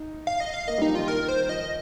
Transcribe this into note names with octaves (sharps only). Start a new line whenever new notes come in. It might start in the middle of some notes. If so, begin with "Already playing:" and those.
Already playing: D#4
F5
D#5
F5
A#3 D#5
G3
D#4
F3
D#3 F4
A#4
C5
F3 D#5